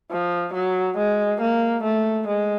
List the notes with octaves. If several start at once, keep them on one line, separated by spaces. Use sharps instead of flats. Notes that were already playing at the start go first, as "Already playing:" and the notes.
F3
F#3
G#3
A#3
A3
G#3